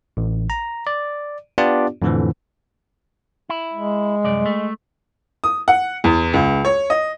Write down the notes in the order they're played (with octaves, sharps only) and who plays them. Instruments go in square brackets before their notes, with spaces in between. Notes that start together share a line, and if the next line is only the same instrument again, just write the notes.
[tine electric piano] A1
A#5
D5
B3 D4 F4 G4 D5
F2 A2 D3 E3 F3
[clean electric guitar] E4
[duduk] G#3
[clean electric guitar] C2 F#2 D5
A3
[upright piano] D#6
F#5
E2
C#2
C#5
D#5